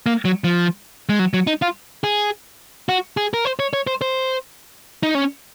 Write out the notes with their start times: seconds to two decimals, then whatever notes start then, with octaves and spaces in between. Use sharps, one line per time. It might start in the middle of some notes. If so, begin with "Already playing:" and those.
0.06 A#3
0.25 F#3
0.44 F3
1.09 G#3
1.19 F#3
1.34 F#3
1.47 D#4
1.62 F4
2.04 G#4
2.89 F#4
3.17 G#4
3.34 A#4
3.45 C5
3.59 C#5
3.73 C#5
3.87 C5
4.01 C5
5.03 D#4
5.15 C#4